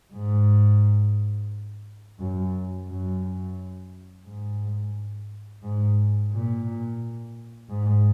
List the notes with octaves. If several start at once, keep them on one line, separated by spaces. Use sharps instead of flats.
G#2
F#2
F#2
G#2
G#2
A#2
G#2